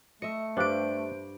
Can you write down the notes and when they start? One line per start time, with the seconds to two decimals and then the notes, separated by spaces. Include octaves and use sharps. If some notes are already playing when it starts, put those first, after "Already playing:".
0.22 A3 D#5 E5 C#7
0.57 G2 G3 D4 G4 C5 F5 D7